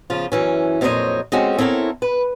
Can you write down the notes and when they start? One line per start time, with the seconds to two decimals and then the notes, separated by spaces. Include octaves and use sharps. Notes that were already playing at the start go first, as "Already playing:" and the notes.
0.10 C#3 F3 F4
0.32 F#2 E3 C#4
0.81 F2 A#2 F#3 C5 C#5 D#5
1.32 G#3 C4 C#4 F4 F#4 A4
1.58 C4 E4 A4 A#4 C#5
2.02 B4